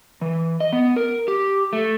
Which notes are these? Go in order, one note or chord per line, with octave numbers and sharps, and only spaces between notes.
E3
D#5
B3
A#4
G4
A3